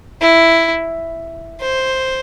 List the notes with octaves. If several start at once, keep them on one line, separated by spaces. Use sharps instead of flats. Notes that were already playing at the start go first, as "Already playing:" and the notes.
E4
C5